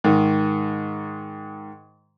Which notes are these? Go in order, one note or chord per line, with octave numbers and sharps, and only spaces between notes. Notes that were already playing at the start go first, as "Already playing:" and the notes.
G#2 D#3